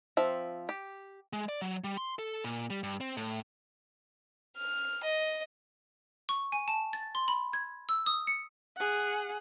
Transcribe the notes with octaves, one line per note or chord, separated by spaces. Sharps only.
F3 C4 E5
G4
G#3
D5
F#3
G3
C6
A4
A#2
G3
G2
C4
A2
F6
D#5
C#6
G#5
A5
A6
C6
B5
G#6
E6
D#6
C#7
G#4 F#5